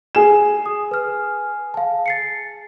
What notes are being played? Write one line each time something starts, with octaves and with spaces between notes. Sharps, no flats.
G#4 E7
D#6
B4 F6
F5 A5
A6 C7 C#7